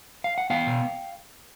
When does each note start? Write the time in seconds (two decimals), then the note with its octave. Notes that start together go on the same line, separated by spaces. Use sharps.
0.24 F5
0.38 F#5
0.50 B3 F5 G5
0.67 B2